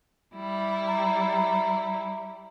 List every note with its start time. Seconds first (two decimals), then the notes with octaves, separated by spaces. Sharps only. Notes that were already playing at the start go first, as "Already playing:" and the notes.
0.35 G3 E4
0.87 A#5